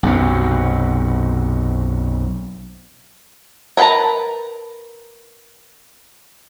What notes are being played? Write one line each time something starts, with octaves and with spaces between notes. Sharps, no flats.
B1 F#2 C3
A#4 B4 G5 A5 A#5